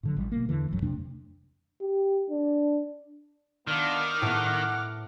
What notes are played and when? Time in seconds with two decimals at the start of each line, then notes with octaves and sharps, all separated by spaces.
0.03 A2 D3 F#3
0.17 A1 G3
0.32 B2 A#3
0.49 E2 D3 E3
0.71 D#1 C2 F#2 F#3
0.82 F2 C3 A3 D4
1.81 G4
2.30 D4
3.67 D#3 B3 D4 F4 D6 F6
4.22 A2 B3 F#5